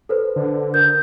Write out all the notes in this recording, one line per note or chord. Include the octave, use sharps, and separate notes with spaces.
A4 B4 C5
D3
A#4 G6